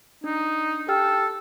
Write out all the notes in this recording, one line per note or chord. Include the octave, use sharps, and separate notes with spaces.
D4 D#4
G4 A4 G5 F6